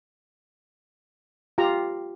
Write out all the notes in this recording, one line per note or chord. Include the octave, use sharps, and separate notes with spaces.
F4 G4 A#5